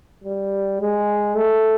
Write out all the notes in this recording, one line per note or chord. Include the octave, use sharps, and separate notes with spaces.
G3
G#3
A3